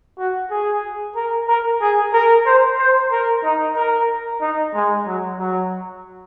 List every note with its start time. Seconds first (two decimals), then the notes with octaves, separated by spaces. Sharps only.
0.18 F#4
0.51 G#4
1.16 A#4
1.48 A#4
1.81 G#4
2.13 A#4
2.46 C5
2.79 C5
3.11 A#4
3.44 D#4
3.76 A#4
4.41 D#4
4.74 G#3
5.06 F#3
5.39 F#3